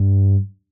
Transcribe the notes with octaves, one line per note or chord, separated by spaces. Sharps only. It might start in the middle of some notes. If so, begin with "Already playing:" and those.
Already playing: G2